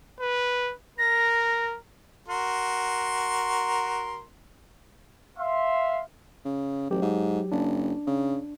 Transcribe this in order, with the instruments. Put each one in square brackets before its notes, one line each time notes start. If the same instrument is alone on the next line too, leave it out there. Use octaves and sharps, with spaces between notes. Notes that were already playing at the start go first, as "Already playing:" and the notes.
[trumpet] B4
[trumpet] A#4 [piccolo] A#6
[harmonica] F#4 A#4 C6
[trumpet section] E5 F5 C6
[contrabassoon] C#3
[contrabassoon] A1 [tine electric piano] F#3 G4
[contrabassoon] G#2
[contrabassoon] F#1 [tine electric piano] D4
[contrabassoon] C#3